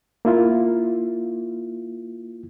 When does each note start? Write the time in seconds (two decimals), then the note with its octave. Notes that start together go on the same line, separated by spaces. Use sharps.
0.25 A#3 E4 F4